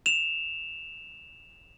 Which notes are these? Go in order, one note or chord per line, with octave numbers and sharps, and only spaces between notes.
E7 F7